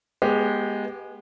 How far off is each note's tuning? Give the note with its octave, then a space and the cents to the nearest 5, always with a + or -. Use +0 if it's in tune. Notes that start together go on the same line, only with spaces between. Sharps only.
G#3 +0 B3 -25 G4 +0